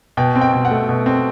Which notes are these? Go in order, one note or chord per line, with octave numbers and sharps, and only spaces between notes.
B2 G5
C4
G5
B2
F#5
A3
B2
C4